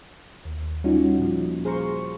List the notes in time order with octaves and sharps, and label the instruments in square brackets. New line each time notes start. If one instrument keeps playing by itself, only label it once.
[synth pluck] D#2
G3 C#4 D#4 F4 F#4
A#2 F3
G#4 C5 F5 A#5 C6 C#6